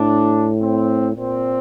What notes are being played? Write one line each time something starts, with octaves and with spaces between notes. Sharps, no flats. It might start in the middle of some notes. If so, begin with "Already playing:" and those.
Already playing: A2 D4
C4
A#2 C4